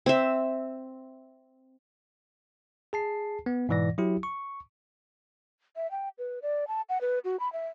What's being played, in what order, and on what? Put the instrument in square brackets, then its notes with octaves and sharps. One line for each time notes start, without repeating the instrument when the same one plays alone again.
[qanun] C4 E5
[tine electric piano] G#4 A5 C7
B3
G#2 B2 E3 D5 A#6
F#3 E4 G4
C#6
[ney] E5
G5
B4
D5
A5
F#5
B4
F#4
B5
E5